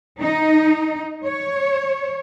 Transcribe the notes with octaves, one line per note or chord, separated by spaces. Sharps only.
D#4
C#5